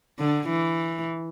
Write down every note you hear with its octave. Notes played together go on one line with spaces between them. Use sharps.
D3
E3